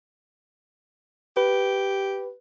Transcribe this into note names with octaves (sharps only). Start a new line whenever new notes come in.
G4 B4